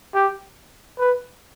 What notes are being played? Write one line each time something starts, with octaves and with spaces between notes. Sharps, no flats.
G4
B4